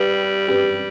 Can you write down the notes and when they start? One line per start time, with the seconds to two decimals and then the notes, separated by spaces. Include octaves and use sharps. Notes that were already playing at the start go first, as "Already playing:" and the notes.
Already playing: G3 G4 B4
0.48 G4 B4